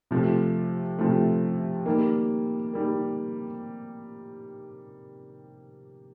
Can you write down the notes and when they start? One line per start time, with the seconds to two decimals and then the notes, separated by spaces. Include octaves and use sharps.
0.11 C3 F3 A3
0.99 C3 F3 A3
1.86 D#3 G3 A#3
2.74 D#3 G3 A#3